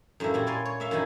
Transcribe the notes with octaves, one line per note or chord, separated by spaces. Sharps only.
F#2 A2 A#3 E4 E5
A#2 G3 E4
A#4 C#5 D5 G#5 C6
C#5
A#3 E5 F5
F#2 D#3 E4 G#5 B5